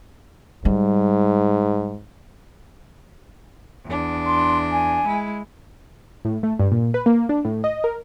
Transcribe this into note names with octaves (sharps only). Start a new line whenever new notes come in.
G#2 G3
E2 D4
C6
G#5
G#3 E4
A2
A3
G2
A#2
B4
A#3
D4
A2
D#5
A#4